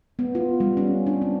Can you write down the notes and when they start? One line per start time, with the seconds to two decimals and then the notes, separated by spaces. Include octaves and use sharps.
0.19 B3
0.35 F4
0.60 G3
0.77 C#4
1.07 D4
1.22 C4